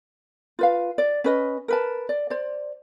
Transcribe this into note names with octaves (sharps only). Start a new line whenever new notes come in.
F4 B4 F5
D5
C#4 B4 D#5
A#4 B4 A5
D5
C5 D5